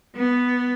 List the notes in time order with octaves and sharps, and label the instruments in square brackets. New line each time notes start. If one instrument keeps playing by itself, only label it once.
[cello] B3